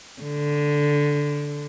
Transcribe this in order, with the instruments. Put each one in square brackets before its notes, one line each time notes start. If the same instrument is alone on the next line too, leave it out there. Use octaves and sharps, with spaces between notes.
[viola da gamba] D3